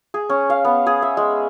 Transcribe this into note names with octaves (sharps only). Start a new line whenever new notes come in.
G#4
C#4
F5
B3
G#4
E5
G#3